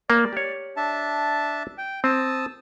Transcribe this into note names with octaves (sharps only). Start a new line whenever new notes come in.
A#3 D5
G4 C#5
D4 E5 A5
G5
C4 A5 D#6 E6